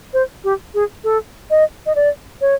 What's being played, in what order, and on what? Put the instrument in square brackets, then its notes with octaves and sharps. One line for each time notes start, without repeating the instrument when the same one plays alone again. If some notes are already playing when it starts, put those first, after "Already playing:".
[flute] C5
G4
G#4
A4
D#5
D#5
D5
C#5